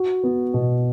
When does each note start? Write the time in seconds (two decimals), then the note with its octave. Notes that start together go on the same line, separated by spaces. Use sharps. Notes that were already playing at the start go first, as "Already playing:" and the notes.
Already playing: F#4
0.24 B3
0.54 B2